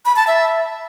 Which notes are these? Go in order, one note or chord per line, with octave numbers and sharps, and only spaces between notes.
B5
A5
E5